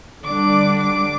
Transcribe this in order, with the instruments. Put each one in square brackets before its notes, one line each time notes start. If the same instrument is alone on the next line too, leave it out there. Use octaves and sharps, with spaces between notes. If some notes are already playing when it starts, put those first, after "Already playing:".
[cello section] D3 G3 D4 [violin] D6
[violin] D6